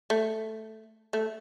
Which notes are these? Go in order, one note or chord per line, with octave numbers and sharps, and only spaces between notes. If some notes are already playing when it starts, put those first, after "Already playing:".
A3
A3